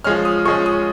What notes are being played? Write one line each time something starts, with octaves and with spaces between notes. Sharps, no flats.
F3 G#3 C#4 F6
D#6
F3 G#3 C#4 C#6
D#6